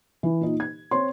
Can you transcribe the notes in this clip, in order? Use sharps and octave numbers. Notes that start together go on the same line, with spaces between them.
E3
A#2 D#4
G#6
C4 C#5 C6